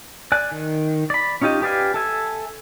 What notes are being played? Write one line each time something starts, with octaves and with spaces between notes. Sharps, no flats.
D5 G#5 F#6
D#3
D5 B5
C#4 D#4 F4 G4 D#5
G4 B4 D5 F5 G#5
A4 E5 G#5